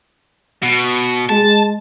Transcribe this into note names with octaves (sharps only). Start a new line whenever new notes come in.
B2
G#3 A5